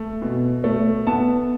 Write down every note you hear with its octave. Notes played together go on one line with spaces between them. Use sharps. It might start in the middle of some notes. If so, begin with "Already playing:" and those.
Already playing: A3
B2
A3
B3 A5